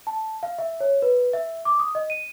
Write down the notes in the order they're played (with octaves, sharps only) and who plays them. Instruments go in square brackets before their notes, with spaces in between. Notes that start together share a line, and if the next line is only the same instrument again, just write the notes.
[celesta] A5
F5
E5
C#5
B4
E5
D6
D#6
D#5
D#7